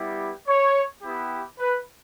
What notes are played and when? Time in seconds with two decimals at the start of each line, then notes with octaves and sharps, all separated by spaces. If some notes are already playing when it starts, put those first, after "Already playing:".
Already playing: G3 B3 E4 G4
0.47 C#5
1.02 B3 E4 G4
1.58 B4